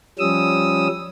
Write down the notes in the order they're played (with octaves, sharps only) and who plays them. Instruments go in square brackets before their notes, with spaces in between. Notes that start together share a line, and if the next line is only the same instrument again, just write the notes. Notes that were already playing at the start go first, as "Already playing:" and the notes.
[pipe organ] F3 G3 C#4 D#6 E6